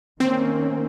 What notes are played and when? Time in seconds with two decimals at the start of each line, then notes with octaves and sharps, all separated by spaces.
0.20 D#3 A#3 C4 C#4